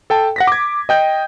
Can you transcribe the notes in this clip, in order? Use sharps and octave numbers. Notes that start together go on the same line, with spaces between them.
A4 G5 A5
F#5 A#6 B6
D6 G#6
D#5 G5 G6